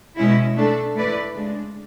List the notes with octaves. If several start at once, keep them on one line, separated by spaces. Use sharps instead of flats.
B2 G#3 C#4 E4
A3 D4 A4
A3 E4 B4 D5
C#3 G#3 D4